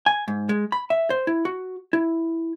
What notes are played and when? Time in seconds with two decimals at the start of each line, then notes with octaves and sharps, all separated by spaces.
0.06 G#5
0.28 G#2
0.49 G#3
0.72 B5
0.90 E5
1.10 C5
1.27 E4
1.45 F#4
1.93 E4